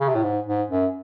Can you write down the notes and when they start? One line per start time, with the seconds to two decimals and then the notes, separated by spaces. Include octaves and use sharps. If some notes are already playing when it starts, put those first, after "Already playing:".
0.01 C#3
0.09 C3
0.15 A2
0.23 G#2
0.47 G#2
0.70 F#2